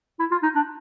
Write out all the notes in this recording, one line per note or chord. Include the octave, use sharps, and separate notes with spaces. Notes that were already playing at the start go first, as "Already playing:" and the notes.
E4
F4
D#4
D4